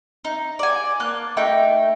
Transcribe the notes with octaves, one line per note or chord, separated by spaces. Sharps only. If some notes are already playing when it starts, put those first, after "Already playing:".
D#4
D5 G#5
A#3 A5 F#6
A3 D#4 G5